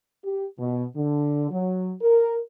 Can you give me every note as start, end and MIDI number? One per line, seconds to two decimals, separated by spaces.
0.24 0.46 67
0.59 0.84 47
0.96 1.48 50
1.51 1.94 54
2.02 2.38 70